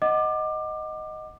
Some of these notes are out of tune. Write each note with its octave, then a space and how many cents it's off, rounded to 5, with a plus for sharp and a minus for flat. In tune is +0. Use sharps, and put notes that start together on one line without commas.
D#5 +0 F#5 +0 D6 +25